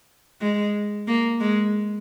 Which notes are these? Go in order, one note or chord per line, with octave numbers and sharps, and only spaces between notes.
G#3
A#3
G#3